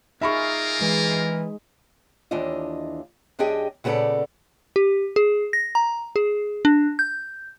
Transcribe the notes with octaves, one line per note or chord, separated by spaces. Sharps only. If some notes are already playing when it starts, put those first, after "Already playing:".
A#3 D#4 F4 G#4 A#4 E5 B5 C#6
E3 G#3
D#2 E3 D4 F4 D#5
F#2 D4 G4 G#4 D#5 G5
A#2 C#3 B3 F4 A4 D5
G4
G#4
A#6
A#5
G#4
D4
G6